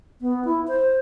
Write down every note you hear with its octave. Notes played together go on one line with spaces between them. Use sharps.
B3
E4
C5